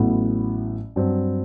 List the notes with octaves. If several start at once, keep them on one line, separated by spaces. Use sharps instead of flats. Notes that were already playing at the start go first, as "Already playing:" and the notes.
Already playing: A1 A2 F#3 B3
G2 F#3 C4